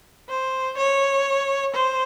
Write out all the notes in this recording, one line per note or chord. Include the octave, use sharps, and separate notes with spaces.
C5
C#5
C5